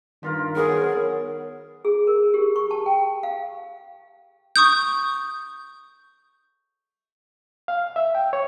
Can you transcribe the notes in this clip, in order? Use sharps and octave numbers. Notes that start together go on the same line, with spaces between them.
G2 D#3 F4 A#4
F#3 B3 G#4 A#4 C#6
G#4
A#4
G4
C#6
A5
G5
F5
C#6 D#6 G6
F5
E5
G5
C#5